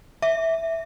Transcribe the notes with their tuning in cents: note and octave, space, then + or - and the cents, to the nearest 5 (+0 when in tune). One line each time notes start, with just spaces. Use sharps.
E5 -5